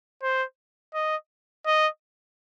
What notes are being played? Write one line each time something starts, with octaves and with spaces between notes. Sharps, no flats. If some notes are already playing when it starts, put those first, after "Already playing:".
C5
D#5
D#5